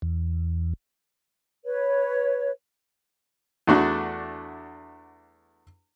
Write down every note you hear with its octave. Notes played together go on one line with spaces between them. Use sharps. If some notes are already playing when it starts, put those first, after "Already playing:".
E2
B4 C#5
E2 A3 D4 F#4